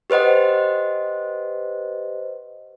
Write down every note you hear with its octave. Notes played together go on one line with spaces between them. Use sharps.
G4 B4 C5 D#5 F#5